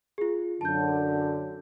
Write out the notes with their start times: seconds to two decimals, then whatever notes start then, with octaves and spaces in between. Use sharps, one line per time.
0.18 F4 G#4
0.61 F#2 D3 A5 G6